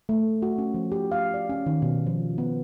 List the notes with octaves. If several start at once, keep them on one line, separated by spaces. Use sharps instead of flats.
A3
F#4
C#4
F3
G4
F5
D5
C#4
D#3
B2
F3
B3